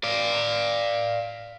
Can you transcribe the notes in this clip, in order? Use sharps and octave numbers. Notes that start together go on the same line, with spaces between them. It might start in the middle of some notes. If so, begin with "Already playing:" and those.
D5 F5